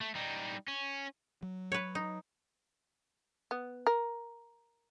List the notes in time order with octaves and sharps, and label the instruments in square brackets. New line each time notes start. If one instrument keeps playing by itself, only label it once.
[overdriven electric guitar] A3
G3 D#4
C#4
[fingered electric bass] F#3
[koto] B4 C#5
D#4
[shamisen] B3
A#4